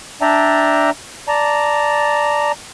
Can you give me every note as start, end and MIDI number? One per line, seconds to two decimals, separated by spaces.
0.22 0.90 62
0.22 0.90 74
0.22 0.90 76
0.22 0.90 79
0.22 0.90 81
0.22 0.90 82
1.28 2.52 74
1.28 2.52 81
1.28 2.52 82